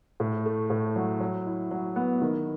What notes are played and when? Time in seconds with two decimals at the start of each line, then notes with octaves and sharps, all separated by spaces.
0.20 A2
0.46 A3
0.70 A2
0.96 F#3
1.20 F#3
1.47 E4
1.71 F#3
1.96 B3
2.22 D#3